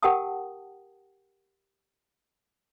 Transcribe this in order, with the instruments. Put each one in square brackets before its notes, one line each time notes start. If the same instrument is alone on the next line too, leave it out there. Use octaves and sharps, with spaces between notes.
[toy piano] G4 A#4 F#5 G5 A5 D#6